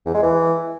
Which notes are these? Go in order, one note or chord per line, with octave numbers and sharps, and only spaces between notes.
E2
G#3
E3